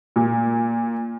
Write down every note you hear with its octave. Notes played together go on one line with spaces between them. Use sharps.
A#2